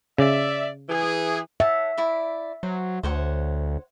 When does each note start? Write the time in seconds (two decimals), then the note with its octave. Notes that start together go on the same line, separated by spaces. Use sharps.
0.18 C#3 D5 E5
0.88 E3 G#4
1.60 C#5 E5 F#5 A5
1.98 E4 D5
2.63 F#3 C5
3.03 D2 C5 C#5 F#5